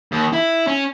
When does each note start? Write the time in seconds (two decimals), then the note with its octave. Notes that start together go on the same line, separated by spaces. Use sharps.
0.12 D#2
0.33 E4
0.67 C#4